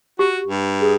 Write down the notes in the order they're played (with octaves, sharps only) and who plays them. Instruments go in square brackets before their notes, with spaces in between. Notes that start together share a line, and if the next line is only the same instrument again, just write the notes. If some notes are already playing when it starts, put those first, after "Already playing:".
[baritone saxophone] F#4 [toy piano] G4
[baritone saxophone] G2
[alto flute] G#4